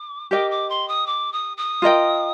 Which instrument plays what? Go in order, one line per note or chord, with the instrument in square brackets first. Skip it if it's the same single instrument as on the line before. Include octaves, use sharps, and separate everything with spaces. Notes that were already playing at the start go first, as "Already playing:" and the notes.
Already playing: [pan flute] D6
[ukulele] G4 A#4 D#5 G5 [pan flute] D6
[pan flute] D6
C6
D#6
D6
D#6
D#6
[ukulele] F4 A#4 D#5 G5